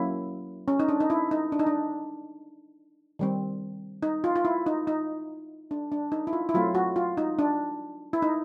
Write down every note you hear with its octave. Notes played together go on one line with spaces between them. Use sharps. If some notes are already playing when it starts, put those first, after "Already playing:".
Already playing: F#3 A#3 C#4 E4
C#4
D#4
D4
D#4
E4
D#4
D4
D#4
D4
D#3 G3 C4
D#4
F4
F4
E4
D#4
D#4
D4
D4
D#4
E4
F4
E4
F#3 A3 C4 F4
F#4
F4
D#4
D4
E4
D#4